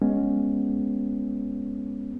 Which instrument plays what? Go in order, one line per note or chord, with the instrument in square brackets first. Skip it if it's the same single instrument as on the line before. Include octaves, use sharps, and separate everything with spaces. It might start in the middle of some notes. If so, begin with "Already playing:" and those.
[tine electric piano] G#3 B3 C#4